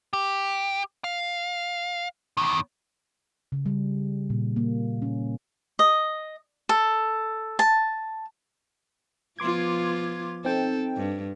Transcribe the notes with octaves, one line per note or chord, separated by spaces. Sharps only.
G4
F5
E2 D#3
C#3
G3
A#2
A#3
C#4
D#5
A4
A5
F3 B3 F4 C6 D6 G#6
C4 D#4 A4 G5
G2